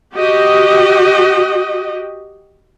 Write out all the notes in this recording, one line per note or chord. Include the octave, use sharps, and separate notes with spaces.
F#4 G4 D#5